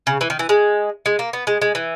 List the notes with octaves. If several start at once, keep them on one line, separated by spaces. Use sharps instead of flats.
C#3
E3
D#3
E3
G#3
G#3
A#3
B3
G#3
G#3
E3